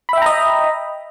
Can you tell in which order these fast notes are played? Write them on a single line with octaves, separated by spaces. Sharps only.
B5 E5 G5 A#5 D#5